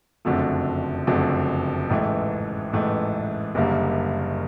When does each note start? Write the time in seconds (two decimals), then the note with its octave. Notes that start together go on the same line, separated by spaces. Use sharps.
0.25 F#1 F2 D3 F#3 A3
1.07 F#1 F2 D3 F#3 A3
1.90 A1 G#2 E3 A3
2.73 A1 G#2 E3 A3
3.55 F#1 F#2 D3 G3 A#3